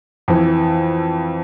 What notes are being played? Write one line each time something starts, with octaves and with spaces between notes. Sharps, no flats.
F2 E3